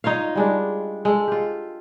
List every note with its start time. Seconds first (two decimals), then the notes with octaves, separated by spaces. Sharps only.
0.04 D#4 F4 C#5 F5
0.35 G3 G#3 D4
1.05 G#3 A4
1.28 F4 G4